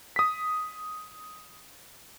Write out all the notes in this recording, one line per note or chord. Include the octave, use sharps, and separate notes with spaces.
D#6 B6